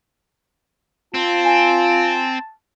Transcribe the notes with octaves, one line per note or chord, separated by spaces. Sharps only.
C4 F4 A5
G#5